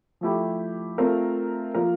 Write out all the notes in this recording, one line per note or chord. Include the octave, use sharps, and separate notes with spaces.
F3 A3 E4 G4
A3 C4 F4 A#4
F3 A#3 F4 A#4